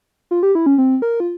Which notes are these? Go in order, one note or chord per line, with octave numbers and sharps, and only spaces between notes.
F4
G4
E4
C#4
C4
A#4
F4